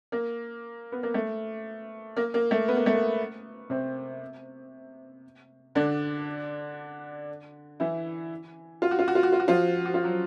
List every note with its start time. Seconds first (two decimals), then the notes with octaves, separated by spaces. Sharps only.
0.12 A#3
0.92 B3
1.03 A#3
1.14 A3
2.17 A#3
2.34 A#3
2.51 A3
2.68 B3
2.77 A#3
2.86 A3
2.94 A#3
3.70 C3 C4
5.75 D3 D4
7.80 E3 E4
8.82 F4
8.91 F#4
8.99 F4
9.08 F#4
9.15 F4
9.23 F#4
9.33 F4
9.40 F#4
9.48 F3 F4
9.85 F#4
9.94 F4
10.04 F#3 F#4